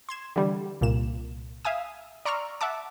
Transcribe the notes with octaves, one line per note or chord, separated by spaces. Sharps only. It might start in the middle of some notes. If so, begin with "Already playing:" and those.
C6 G#6 E7
D3 E3 G3
C2 A#2 E7
E5 F5 G#5 D#6
D5 A#5 C6 C#6 E6 F6
E5 F#5 A5 D6